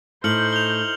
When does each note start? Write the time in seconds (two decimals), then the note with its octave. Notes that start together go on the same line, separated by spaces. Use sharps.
0.24 A2 D#4 C5 F6 C#7 F#7
0.53 F7 G7